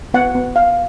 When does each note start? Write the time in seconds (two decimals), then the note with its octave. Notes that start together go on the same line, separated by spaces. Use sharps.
0.14 B3 F#5
0.35 B3
0.56 B3 F5